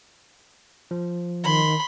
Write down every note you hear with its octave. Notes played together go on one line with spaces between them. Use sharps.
F3
D#3 B5 C6